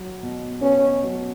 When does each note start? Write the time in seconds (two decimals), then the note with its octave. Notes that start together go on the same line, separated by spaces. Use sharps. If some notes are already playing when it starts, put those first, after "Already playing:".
Already playing: F#3
0.23 B2
0.62 B3 C#4
1.03 F#3